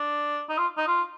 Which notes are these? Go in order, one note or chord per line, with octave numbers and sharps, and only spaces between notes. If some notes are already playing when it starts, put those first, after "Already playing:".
Already playing: D4
D#4
F4
D#4
F4